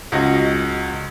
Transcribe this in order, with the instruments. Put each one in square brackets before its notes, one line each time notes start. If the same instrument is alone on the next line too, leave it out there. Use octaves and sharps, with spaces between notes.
[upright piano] C#2 F#4 D#5